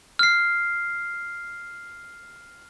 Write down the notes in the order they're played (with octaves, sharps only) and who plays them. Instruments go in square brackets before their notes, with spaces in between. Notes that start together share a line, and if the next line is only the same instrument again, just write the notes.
[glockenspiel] F6 C7